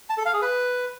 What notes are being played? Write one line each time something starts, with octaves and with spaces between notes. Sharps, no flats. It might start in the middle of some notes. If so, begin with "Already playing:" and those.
A5
A4
F5
G#4
B4